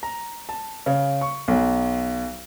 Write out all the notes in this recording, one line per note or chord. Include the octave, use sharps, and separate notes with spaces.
A#5
A5
C#3
C#6
B1